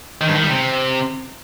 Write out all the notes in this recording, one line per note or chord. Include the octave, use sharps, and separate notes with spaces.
D#3
G2
D#3
G3
C3